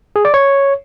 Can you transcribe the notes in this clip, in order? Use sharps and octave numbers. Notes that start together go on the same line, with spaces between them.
G#4
D5
C#5